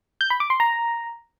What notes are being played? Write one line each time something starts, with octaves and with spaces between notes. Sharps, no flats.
G6
B5
D6
C6
A#5